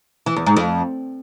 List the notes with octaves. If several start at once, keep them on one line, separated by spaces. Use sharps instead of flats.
E3
E2
G#2
F2